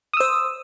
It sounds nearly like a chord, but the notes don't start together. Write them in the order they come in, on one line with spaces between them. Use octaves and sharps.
D#6 E6 C5